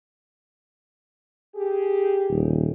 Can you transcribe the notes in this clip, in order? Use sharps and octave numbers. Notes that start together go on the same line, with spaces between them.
G4 G#4
D#1